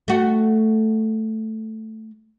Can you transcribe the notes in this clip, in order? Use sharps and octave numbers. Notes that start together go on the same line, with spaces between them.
A3 F#4